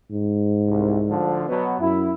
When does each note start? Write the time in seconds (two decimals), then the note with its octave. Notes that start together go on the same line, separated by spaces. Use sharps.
0.11 G#2
0.69 C2
1.09 D2 D3 F3
1.48 B2 F#3 B3
1.80 F#2 E4